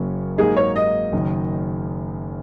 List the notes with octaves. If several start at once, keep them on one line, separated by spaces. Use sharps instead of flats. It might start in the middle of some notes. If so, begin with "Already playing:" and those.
Already playing: F#1 F#2 F#3 A#3 C#4
G#2 F#3 A#3 D#4 G#4
C#5
D#5
F#1 F#2 D#3